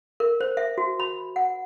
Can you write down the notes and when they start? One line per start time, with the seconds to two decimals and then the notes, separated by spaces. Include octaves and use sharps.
0.20 A#4
0.41 C5
0.57 E5
0.78 F#4
1.00 B5
1.36 F#5